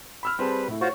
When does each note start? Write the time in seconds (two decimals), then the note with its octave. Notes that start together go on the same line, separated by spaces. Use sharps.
0.23 B5 E6 F6
0.39 G3 C4 G#4 B4 A5
0.68 A2 E4
0.81 F4 F#4 C5 C#5 C#6